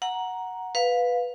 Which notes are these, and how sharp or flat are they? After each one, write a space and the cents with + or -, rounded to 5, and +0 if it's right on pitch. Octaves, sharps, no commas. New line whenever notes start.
F#5 +0 A#5 +5
B4 +0 F5 +15